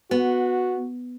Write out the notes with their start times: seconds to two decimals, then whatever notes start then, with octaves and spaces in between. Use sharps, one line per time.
0.11 B3 F#4